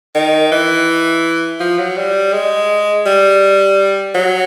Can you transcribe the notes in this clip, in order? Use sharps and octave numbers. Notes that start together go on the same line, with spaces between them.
D#3
E3
F3
F#3
G3
G#3
G3
F#3